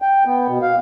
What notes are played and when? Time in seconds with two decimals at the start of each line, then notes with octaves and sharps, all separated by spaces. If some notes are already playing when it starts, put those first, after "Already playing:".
0.02 G5
0.26 B3
0.48 B2
0.62 F5